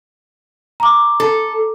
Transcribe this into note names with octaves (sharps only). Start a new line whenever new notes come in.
A#5 D6
A4